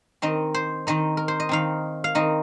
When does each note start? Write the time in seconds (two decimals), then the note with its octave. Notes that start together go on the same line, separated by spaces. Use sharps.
0.22 D#3 C4 D#4 D#5
0.54 C5
0.87 D#3 C4 D#4 D#5
1.17 A#4
1.28 C5
1.40 D#5
1.49 D#3 C4 D#4 F5
2.04 F5
2.15 D#3 C4 D#4 D#5